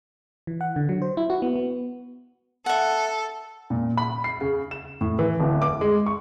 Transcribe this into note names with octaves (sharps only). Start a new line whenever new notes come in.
E3
F#5
D3
F#3
C5
E4
F#4
B3
B3
A4 E5 F#5
A#2
B5
C7
C#3
E7
A2
E3
D1
D6
G#3
C#6